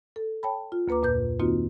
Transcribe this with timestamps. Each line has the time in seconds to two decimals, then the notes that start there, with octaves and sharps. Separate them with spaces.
0.16 A4
0.43 C#5 G5 A5 B5
0.72 F4
0.88 D2 A#3 B4 A#5 D6
1.03 F2 A#2 B4 G6
1.39 D#3 A#3 C4 D#4 F4 F#4